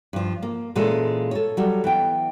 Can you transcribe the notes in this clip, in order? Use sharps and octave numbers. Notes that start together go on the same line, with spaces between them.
G2 F3
A#3
A#2 E3 G#3 C#4 F4 A4
A4 C#5
F#3 G3 A4
E3 B3 G5